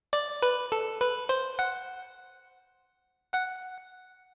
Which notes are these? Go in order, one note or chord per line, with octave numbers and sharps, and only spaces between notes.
D5
B4
A4
B4
C5
F#5
F#5